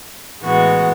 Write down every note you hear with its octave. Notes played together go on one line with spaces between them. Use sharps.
A2 E3 G#3 B3 F#4